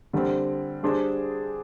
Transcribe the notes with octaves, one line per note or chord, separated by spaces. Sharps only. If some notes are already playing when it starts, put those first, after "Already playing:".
D3 G3 C4
G3 D4 G#4 C5